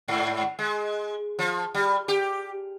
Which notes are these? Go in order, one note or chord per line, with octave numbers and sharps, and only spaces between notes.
G#2
G#3
F3
G3
G4